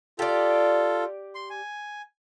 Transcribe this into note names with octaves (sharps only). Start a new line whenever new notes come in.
F4 G4 A4 D5
C6
G#5